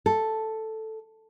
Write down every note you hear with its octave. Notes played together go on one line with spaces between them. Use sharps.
A4